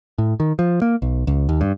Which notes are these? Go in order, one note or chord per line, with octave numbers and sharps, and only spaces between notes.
A2
D#3
F3
A#3
B1
C#2
D#2
G2